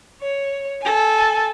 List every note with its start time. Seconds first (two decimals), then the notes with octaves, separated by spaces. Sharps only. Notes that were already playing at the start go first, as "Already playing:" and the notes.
0.22 C#5
0.81 A4 G#5